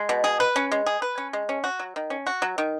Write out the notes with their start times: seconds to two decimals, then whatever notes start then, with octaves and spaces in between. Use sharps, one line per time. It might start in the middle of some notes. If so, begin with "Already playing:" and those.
Already playing: G#3
0.09 B2
0.24 G#4
0.40 B4
0.56 C#4
0.72 G#3
0.86 G#4
1.02 B4
1.18 C#4
1.33 G#3
1.49 C#4
1.64 F#4
1.79 F#3
1.96 D#3
2.10 C#4
2.27 F#4
2.42 F#3
2.58 D#3